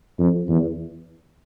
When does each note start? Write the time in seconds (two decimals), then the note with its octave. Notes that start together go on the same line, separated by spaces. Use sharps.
0.19 F2
0.49 E2